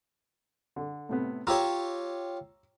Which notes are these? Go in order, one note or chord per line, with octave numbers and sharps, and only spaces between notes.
D3
A2 C3 B3
F4 G4 C#5 A#5 E6